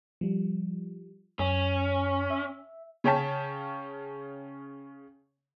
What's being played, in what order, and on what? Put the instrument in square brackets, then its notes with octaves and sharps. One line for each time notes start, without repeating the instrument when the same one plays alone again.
[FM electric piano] F3 G3
[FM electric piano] F#2 [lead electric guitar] C#4
[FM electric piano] E5
[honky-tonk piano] C#3 C#4 C#5 G5 A5 B6